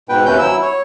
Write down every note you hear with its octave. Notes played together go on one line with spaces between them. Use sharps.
G#2 B2 B4 G5
D#2 C3 C#4 B4 G6
F#3 E4 E6
C#5